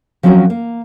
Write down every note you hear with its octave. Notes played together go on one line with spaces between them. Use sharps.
F3 F#3 C4 C#4 F#4 A#4
A#3